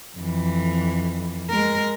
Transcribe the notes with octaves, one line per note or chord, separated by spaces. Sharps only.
F2 E3
G#3 A#4